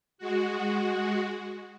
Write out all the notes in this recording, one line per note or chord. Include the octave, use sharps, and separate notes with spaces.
G#3 F#4